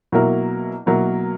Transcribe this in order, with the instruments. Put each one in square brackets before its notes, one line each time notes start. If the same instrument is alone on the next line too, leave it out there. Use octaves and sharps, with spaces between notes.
[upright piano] B2 F#3 A#3 E4 A#4
B2 F#3 A#3 E4 A#4